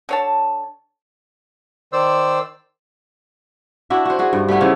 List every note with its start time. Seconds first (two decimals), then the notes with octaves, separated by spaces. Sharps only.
0.09 D3 C#5 A5
1.93 D#3 C5 D5 E6
3.90 D4 E4 F#4 F#5
4.05 F#4 C5
4.19 F#4 G#4
4.33 G2
4.48 G3 A3 B3 E4
4.60 C#3 E3 F3 B3